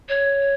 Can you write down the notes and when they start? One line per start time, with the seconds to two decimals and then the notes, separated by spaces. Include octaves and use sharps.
0.09 C#5